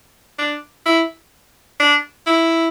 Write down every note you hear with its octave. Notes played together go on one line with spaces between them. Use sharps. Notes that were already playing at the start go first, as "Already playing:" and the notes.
D4
E4
D4
E4